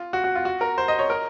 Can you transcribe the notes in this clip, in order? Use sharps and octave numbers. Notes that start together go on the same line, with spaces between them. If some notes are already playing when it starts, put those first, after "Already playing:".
Already playing: F4
F#4
F#4
F4
F#4
A#4
C5
D#5
C#5
A#4